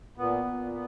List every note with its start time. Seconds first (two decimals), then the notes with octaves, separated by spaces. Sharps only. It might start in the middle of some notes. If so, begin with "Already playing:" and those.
0.17 A#2 B3
0.45 A#2
0.72 B3